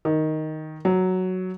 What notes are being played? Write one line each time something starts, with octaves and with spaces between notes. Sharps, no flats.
D#3
F#3